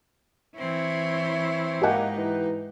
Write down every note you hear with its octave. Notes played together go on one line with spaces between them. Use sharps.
E3 C4 E4 C#5
G#2 A#3 D#4 G4 F#5
E3